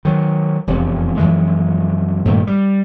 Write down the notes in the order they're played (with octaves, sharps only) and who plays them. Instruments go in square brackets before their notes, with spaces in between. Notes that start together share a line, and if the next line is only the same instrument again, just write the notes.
[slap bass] D#3 F#3
E1 F2 C3
F#2 E3 F3 G#3
G2 A#2 D#3 A3
G3